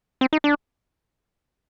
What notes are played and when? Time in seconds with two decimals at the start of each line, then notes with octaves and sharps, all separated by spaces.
0.21 C4
0.33 D#4
0.44 D4